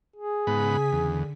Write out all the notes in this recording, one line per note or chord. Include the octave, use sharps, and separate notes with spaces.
G#4
G#2 C#3 B3 G#5 B5 B6
E2 D3